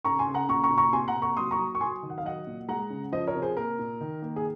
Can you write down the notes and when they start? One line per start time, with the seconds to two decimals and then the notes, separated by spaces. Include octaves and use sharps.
0.05 C#3 A#5 C#6
0.19 G#5 C6
0.27 C#3
0.34 F#5 A#5
0.49 A#2 A#5 C#6
0.64 A#5 C#6
0.70 A#2
0.78 A#5 C#6
0.93 C3 G#5 C6
1.08 F#5 A#5
1.15 A#3
1.22 A#5 C#6
1.37 F#3 C6 D#6
1.51 A#5 C#6
1.58 F#3
1.75 C#6
1.81 F#3 G#5 C6
2.03 D#3
2.10 F#5
2.18 F5
2.25 F#3 D#5 F#5
2.47 A#2
2.69 G#3 F#5 A#5
2.90 C#3
3.12 F3 C5 D#5
3.27 A#4 C#5
3.35 C3
3.42 G#4 C5
3.57 A#3 A#4
3.79 A#2
4.01 D#3
4.22 A#3
4.36 G#4